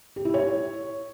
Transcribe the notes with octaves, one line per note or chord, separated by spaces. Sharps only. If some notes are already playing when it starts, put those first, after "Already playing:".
G4
E4
C#5